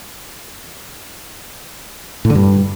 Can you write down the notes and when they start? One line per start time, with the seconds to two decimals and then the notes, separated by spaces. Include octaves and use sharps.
2.25 A2
2.30 D3
2.35 G2